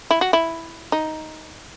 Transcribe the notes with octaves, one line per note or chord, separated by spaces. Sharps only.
E4
F#4
E4
D#4